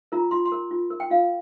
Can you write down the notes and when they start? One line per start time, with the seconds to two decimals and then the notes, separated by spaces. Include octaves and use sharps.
0.12 F4 A#4 A#5
0.31 F4 C6
0.45 C6
0.52 A#4
0.71 F4
0.90 A#4
1.00 G5
1.10 F4 F5